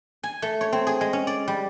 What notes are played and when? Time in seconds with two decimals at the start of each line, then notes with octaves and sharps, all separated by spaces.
0.23 G#5
0.42 A3
0.61 C#5
0.72 C4
0.87 G#4
1.01 G#3
1.13 C#4
1.27 D5
1.48 G3